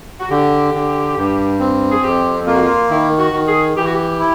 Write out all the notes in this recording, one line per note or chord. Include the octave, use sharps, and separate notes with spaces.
F#4
D3 G4
D3
G2
C4
G#4
F2 G4
A#3 F4
F#4
F4
D#3 E4
F#4
D#3
G#4
E3 G4
F#4
G4
E4